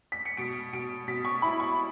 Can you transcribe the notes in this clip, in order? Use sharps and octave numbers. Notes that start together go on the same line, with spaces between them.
B6
C#7
B2 D7
B2 D7
B2 B6
C#6
E4 B5
C#6